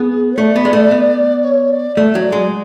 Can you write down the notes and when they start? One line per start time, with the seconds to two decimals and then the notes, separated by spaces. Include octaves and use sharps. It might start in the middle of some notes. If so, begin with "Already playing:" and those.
Already playing: B3 G#4
0.37 A3 D5
0.56 B3
0.65 G#3
0.73 A3
0.91 B3
1.44 C#5
1.71 D5
1.97 A3 D5
2.15 F#3
2.24 D5
2.32 G#3